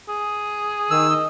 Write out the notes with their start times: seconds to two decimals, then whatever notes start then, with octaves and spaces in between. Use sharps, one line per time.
0.09 G#4
0.91 D#3 E6
1.09 D#5